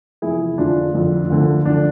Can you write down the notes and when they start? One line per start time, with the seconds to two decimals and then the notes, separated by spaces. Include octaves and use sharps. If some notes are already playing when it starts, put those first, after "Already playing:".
0.22 E2 C3 F3 E4 G#4
0.58 F2 D3 F3 D4 F4
0.94 F2 D3 F3
1.30 D2 D3 F3
1.65 D2 D3 F3 D4